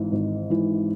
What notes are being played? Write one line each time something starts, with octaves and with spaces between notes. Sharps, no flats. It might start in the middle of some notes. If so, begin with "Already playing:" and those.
Already playing: G#1 G#2 E3
G#1
G#2 E3